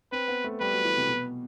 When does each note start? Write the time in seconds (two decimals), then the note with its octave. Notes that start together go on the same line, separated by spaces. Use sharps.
0.12 C4 B4
0.28 B3
0.44 A3
0.60 G3 B4
0.73 F#3
0.84 E3
0.97 C3
1.08 B2